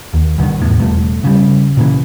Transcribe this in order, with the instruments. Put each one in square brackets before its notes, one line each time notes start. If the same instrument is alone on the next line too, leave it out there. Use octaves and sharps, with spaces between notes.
[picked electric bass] D#2
B1 G2 D3 D#3
G#1 E2 A2
E1 G2 A3
C#3 G3
A#2 C#3 E3